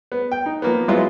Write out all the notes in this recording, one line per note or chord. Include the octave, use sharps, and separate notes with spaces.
B3
G5
D#4
F3 A#3 B3
F#3 G#3 B3 E4 F4